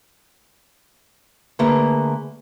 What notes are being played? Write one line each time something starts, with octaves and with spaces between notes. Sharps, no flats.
D3 A3 A#3 G#4 B4